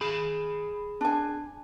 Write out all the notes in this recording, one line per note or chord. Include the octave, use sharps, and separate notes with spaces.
G#4 B5
D4 G#5